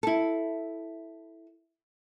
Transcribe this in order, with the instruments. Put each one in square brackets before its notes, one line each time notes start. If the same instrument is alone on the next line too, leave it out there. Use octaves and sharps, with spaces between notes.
[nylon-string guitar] E4 A4